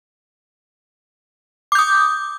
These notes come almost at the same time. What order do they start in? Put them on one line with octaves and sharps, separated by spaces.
D6 G6 D#6